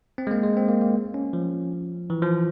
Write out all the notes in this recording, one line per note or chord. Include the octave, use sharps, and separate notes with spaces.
C4
G#3
A#3
G#3
C4
A#3
A#3
C#4
F3
E3
F3